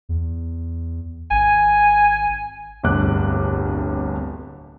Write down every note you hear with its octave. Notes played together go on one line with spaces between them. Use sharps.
E2
G#1 G#5
D1 G1 C2 D6 F#6